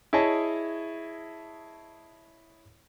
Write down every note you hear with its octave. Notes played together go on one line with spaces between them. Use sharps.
E4 G#4 C#5 D#5 A5